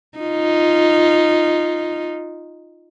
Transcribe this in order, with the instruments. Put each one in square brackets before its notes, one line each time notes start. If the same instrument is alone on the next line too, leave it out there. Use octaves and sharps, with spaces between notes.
[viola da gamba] D#4 F4